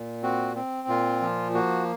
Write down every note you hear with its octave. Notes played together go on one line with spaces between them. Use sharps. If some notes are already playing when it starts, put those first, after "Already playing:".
Already playing: A#2
C4 F#4
C4
A#2 F4
F3
A#3 F#4